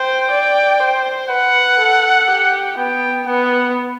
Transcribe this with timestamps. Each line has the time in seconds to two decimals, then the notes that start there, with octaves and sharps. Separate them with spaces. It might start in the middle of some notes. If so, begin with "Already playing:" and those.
Already playing: C5 G5
0.31 D5
0.80 C5
1.29 B4 F#5
1.78 A4
2.28 G4
2.77 B3 G5
3.26 B3 F#5